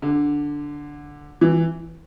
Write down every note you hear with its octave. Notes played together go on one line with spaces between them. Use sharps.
D3
E3